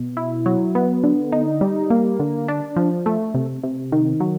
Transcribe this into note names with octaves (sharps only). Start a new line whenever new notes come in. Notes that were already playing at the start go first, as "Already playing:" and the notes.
Already playing: B2
E4
F#3
B3
D3
D#4
G3
A#3
D3
D4
F3
A3
C3
C3
D#3
F#3